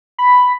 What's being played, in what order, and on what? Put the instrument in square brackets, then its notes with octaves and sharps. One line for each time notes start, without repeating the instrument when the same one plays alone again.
[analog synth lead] B5